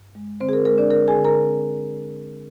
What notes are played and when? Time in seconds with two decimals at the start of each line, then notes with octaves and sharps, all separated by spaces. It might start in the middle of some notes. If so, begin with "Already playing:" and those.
Already playing: G2
0.15 G#3
0.40 D3 C4 C5
0.49 G#4
0.53 A#4
0.66 G#3 A#4
0.78 D4 D5
0.91 D3 A#4
1.08 G#4 G#5
1.16 D3
1.24 A#4 A#5
1.42 C4